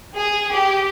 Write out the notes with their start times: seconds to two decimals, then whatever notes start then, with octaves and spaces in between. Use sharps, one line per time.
0.17 G#4
0.52 G4